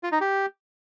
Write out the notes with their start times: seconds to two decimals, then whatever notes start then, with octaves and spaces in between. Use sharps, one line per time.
0.03 F4
0.12 D#4
0.21 G4